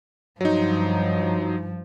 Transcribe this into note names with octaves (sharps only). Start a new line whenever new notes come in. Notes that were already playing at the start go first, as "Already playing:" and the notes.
G2 F3 F#3 D#4